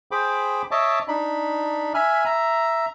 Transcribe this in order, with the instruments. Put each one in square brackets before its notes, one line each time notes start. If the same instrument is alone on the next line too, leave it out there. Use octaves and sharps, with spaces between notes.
[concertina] G#4 C5 G5 B5 D6
C#5 D#5 E5 A5 D6
D4 D#4 B5
E5 G#5 B5 F6
E5 A#5